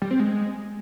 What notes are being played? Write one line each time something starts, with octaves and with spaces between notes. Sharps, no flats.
G3
C4
G#3